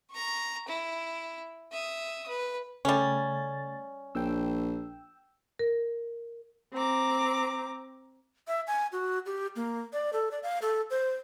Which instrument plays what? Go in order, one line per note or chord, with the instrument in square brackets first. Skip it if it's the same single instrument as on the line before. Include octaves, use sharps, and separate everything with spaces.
[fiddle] A#5 C#6
E4
E5 D#6
B4
[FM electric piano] C#3 A3 A6 [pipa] G3 C#4
[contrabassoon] A#1 [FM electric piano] G5 E6
[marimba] A#4
[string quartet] C4 A#5 D6
[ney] E5
G#5
F#4
G4
A#3
D5
A4
D5
F5
A4
C5